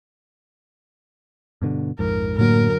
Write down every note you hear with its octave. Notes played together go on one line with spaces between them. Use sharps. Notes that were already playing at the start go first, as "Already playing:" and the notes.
G2 B2 D3
A#1 F2 G#2 A#4
F#2 A2 D3 F#3 A#3 A#4